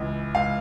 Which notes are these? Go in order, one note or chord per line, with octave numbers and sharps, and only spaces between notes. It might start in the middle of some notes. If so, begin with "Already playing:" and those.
Already playing: C#2 E3
C#2 F5